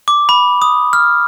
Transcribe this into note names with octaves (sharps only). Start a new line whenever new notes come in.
D6
B5
D#6
F6